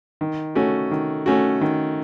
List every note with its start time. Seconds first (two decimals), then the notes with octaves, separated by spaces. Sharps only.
0.21 D#3
0.55 A3 C#4 F#4
0.91 D#3
1.26 A3 C#4 F#4
1.61 D#3